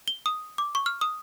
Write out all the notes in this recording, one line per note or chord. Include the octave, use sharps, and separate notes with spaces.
G7
D#6
D6
C#6
F6
D#6